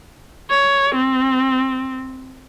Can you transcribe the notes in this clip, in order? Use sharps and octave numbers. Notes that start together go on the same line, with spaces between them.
C#5
C4